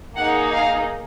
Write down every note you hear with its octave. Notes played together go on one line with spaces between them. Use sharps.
A#3 D#4 G#4 F#5
F5